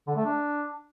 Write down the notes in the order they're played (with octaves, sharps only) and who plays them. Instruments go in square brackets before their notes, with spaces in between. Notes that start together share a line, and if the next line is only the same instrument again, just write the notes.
[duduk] D3
A3
D4